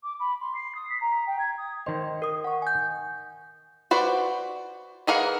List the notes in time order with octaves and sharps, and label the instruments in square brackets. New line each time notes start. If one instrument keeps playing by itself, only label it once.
[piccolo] D6
B5
C6
C7
D#6
B6
A#5
G5
G#6
D#6
[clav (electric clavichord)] D#3 C5 [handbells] D#5
[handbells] A#4 D#6
F#5 C#6
G#5 G6
[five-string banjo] F#4 B4 C5 D5
E3 G#4 A#4 F5 F#5